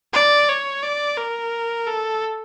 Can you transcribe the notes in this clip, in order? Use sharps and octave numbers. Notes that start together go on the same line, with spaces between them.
D5
C#5
D5
A#4
A4